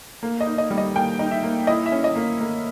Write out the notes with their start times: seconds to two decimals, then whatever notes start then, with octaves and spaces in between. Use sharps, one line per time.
0.23 A#3
0.41 D#5
0.47 D#4
0.58 D#5
0.70 G3
0.78 D#5
0.95 A#3 G5
1.19 D#4
1.31 E5
1.43 A#3
1.67 E4 D#5
1.86 E5
1.92 C#4
2.04 D#5
2.16 A#3
2.41 A#3